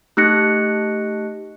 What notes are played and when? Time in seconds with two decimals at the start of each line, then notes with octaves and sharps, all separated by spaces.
0.17 A3 D#4 G4 F#6 A#6 C#7